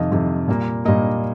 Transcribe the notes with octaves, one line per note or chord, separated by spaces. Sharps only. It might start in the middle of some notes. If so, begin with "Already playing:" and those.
Already playing: F2 C3 D#3 D#5 F5
F2 C3 D#3
A#2 G3 A#3
A#2 G3 A#3 D#5